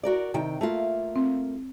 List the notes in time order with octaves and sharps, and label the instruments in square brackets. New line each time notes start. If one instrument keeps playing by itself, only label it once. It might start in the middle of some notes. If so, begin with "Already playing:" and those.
[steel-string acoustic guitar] F#4 A#4 D5
C3 D#3 G5
A3 A#3 F4
[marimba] C4